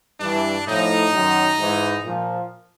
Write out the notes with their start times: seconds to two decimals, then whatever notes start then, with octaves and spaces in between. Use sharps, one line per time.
0.20 G2 E3 D4
0.66 A2 F3 D#4
1.12 F#2 D#3 F#3
1.57 G#2 E3
2.03 A#2 F3